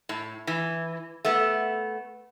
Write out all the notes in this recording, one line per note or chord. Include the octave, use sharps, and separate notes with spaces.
A2
E3
A3 B3